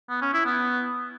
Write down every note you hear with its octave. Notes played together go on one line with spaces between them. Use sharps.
B3
C#4
E4
B3